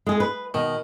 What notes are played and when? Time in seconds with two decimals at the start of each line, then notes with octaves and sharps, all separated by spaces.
0.06 G#3 G#4
0.20 B4
0.54 B2 D#3